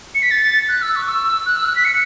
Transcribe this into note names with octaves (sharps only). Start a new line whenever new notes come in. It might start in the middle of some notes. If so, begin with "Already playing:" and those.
C#7
B6
A6
F#6
E6
C#6
E6
F#6
E6
F#6
B6
C#7